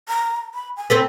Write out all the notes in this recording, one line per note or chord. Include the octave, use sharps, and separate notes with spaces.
A#5
B5
G#5
C4 A4 B4